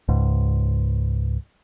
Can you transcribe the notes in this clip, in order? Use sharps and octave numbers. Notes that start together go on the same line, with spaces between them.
C#2 G#2